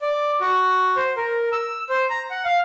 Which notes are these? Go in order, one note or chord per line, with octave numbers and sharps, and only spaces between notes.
D5
F#4
C5
A#4
E6
C5
A#5
F#5
F5